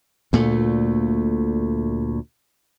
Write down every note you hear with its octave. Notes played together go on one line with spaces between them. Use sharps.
D2 A#2 A3